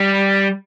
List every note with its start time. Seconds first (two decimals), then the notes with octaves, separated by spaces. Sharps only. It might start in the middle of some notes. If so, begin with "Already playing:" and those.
Already playing: G3